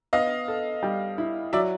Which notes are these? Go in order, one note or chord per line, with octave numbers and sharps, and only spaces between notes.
B3 D#5 F5
A4
G3
E4
F#3 D5 E5